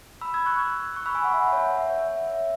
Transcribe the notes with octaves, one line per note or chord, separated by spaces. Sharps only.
B5 E6
E6 G#6
C#6 F#6
E6 G#6
C#6 F#6
B5 E6
G#5 C#6
F#5 B5
E5 G#5
C#5 F#5
E5
C#5
E5
E5